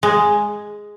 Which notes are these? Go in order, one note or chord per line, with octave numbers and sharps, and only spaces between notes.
G#3